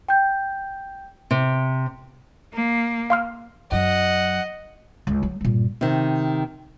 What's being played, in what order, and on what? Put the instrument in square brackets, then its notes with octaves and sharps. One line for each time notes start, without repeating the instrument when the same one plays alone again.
[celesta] G5 G6
[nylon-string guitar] C3
[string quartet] A#3
[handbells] F5 C6 F6
[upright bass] F#2 F#3 [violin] D#5 [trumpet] F#5
[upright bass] C#2 D3
F#3
G2 A#2
[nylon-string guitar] C3 D#3